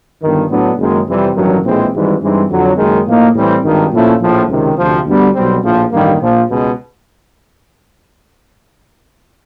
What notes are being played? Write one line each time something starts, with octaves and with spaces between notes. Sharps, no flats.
G1 G2 D#3
A2 F#3 B3 D4
F#1 F#2 D#3 G#3
F2 C3 E3 G3 C4
A1 G2 D#3 F#3
A#1 A2 E3 G#3 C4
G#1 G#2 E3 G3
G2 E3 G#3 C4 D#4
F2 D3 F#3
F#1 F#2 D#3 G#3
A2 F3 A#3 D#4
A2 E3 G3 C4
G#1 G2 D#3
A#2 F3 A3 C#4 E4
A#1 A2 F3
C#2 C3 D#3
D2 C3 F3
D2 D3 G3 B3
B1 B2 G3 C4
A#1 A2 F3
A1 G2 D#3 G3 A#3
A#1 A#2 F3
C#2 B2 G#3